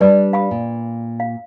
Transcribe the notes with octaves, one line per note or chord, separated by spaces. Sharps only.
G3 D4 B4 D5 D#6
F5 B5 D#6
A#2
F5